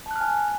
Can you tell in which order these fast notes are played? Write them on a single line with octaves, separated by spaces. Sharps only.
A5 F#6 F6 G#5